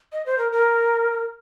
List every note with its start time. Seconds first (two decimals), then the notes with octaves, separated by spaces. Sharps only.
0.12 D#5
0.26 C5
0.38 A#4
0.52 A#4